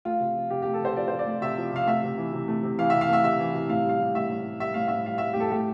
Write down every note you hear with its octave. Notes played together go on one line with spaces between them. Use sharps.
A3 F4
C3
F3
C3 G4
A3 G4
A4
C3 C5
F3 D5
C3 C5
D5
A3
C3 E5
F3
C3 F5
A3 E5
C3
E3
C3
A3
C3
E3 F5
C3 E5
F5
A3 E5
C3 E5
E3
C3
A2 F5
G3 F5
G3
A2 E5
A2
G3
G3 E5
A2 F5
A2 E5
G3 F5
G3 E5
G4
A2 A4
A3 G4